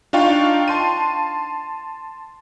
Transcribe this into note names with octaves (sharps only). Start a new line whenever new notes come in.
D4 D#4 F4 F5 G5 C#6
A5 C6 D#7